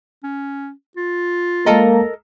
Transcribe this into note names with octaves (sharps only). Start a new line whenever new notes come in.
C#4
F4
G#3 A#3 A4 A#4 D#5 A5 A#5